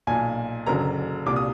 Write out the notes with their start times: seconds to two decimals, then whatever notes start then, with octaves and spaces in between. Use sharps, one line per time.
0.07 B1 A#2 G#5
0.66 F#1 F#2 D3 A#5
1.26 C2 A#2 D6
1.36 D#6